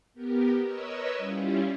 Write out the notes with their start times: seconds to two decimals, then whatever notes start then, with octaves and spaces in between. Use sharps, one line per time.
0.14 B3 G4 A#4
0.62 A#4 B4 C#5 D#5 E6
1.18 G3 C#4 E4 F4